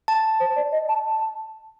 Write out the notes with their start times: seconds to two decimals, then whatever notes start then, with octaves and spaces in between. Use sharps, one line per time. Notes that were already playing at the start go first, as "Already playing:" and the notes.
0.08 A5
0.40 C5
0.56 D5
0.72 D#5
0.88 A5
1.04 A5